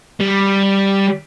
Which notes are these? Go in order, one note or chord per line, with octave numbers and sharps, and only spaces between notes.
G3